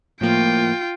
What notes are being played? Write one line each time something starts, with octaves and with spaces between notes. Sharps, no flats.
A2 F3 A#3 F4 G5